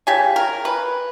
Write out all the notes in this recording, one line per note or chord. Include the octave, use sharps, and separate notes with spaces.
C#3 G4 G#5
A#4
B4